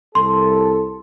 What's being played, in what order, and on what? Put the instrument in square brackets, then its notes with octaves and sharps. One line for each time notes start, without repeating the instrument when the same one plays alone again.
[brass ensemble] C2 A4 [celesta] C6